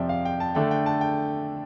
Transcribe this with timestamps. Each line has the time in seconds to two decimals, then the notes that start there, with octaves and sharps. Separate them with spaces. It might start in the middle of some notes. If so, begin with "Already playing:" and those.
Already playing: F2 C3 F3 D5 E5 G5
0.09 F5
0.25 G5
0.40 A5
0.55 D3 A3 D4 G5
0.71 G5
0.86 A5
1.01 G5